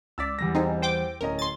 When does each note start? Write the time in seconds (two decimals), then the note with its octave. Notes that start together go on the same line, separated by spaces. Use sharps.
0.18 C#2 D5 E6 A6 B6
0.39 E2 G3 A#6
0.54 C4 D#4 G#4
0.82 C5 G5 D6
1.21 D1 C#4 A#4 D#5
1.39 C6 A6